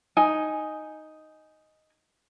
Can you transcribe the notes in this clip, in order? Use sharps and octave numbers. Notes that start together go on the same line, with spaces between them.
D#4 G#5